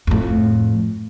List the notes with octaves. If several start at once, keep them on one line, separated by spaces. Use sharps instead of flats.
F2 A2